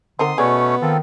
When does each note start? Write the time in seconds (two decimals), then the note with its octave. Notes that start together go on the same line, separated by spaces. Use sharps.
0.19 D3 C4 D#4 A#4 C6 D#6
0.38 B2 A3 B3 C#4 G#4 C#5 D5
0.82 D#3 C4 F4 A4